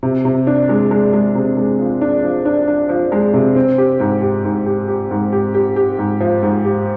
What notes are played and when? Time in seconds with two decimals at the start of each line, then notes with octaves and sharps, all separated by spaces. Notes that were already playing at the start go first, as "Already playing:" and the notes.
0.03 C3
0.25 C3
0.47 D4
0.69 G#3
0.91 G#3
1.13 G#3
1.35 C3
1.57 G#3
1.79 F3
2.01 D4
2.24 F3
2.45 D4
2.68 D4
2.89 F3
3.12 G#3
3.33 C3
3.56 C4
3.78 G4
4.00 G#2
4.22 G4
4.44 G#2
4.66 G4
4.88 G4
5.11 G#2
5.33 G4
5.54 G4
5.76 G4
5.99 G#2
6.20 F3
6.43 G#2
6.65 G4